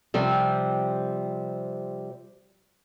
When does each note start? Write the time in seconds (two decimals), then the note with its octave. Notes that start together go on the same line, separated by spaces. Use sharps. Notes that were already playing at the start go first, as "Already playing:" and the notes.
0.14 C3 F3 G3 C4